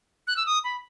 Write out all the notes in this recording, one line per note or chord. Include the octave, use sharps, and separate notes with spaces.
F#6
E6
D#6
B5